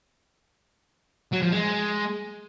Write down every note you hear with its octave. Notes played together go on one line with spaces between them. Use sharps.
F#3
F3
G#3